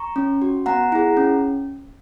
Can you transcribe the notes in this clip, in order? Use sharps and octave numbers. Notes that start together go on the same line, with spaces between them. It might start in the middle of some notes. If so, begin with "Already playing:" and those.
Already playing: A#5 C#6
C#4
F#4
B3 F#5 A#5
E4 G#4
C#4